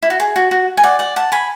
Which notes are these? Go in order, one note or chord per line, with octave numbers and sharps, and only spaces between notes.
E4
F#4
G#4
F#4
F#4
G#5
D5 F#5
D5 F#5
F#5 A5
G#5 B5